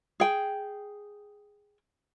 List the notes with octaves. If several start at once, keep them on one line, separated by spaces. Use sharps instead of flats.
G#4 G5